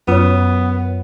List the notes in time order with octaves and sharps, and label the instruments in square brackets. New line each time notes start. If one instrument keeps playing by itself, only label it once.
[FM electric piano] F#2 [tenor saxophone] B3 [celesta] F4 C#5